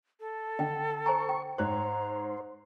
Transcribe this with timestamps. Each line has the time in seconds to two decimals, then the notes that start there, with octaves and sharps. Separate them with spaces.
0.20 A4
0.59 D3 D#5 G5
1.06 C5 G#5 A#5 C#6
1.29 G5
1.58 G#2 C5 C#5 A#5 F#6